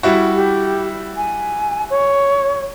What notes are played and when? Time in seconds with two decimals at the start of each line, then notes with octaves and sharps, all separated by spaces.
0.03 G3 E4 F#4
0.35 G4
1.17 G#5
1.90 C#5